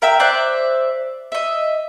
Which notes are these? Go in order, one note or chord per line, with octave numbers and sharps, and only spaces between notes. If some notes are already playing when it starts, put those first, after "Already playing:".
A#4 E5 G5 E6
C5 D5 E5 F#6
D#5 E5